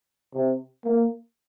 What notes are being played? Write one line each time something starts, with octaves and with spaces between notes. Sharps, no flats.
C3
A#3